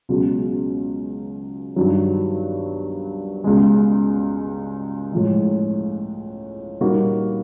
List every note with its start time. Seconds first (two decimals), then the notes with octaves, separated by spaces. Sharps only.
0.09 C#2 B2 F#3
1.76 G2 D#3 F#3
3.44 C#2 B2 G#3
5.12 A2 F3 G#3
6.81 A#2 G3 A#3 D#4 F#4